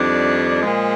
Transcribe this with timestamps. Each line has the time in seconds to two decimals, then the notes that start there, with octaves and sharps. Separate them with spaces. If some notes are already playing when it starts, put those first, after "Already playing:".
Already playing: F2 D#3 G3 D4
0.62 A#2 F3 G#3